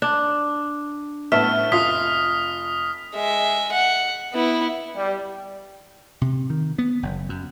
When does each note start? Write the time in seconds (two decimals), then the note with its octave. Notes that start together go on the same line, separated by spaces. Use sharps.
0.02 D4
1.32 A2 B3 E5 A5 F6
1.72 F1 F4 D#6 B6
3.15 G#3 E5
3.72 F#5
4.33 B3 E4
4.97 G3
6.21 C3
6.50 D#3
6.78 B3
7.03 F#1
7.29 F#2